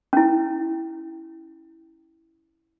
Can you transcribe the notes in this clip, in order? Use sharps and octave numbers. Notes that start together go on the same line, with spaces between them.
C#4 E4